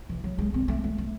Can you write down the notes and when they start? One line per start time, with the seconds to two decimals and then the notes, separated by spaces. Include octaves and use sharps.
0.09 E3
0.24 F#3
0.38 G#3
0.54 C4
0.68 A3
0.84 A3
0.98 A3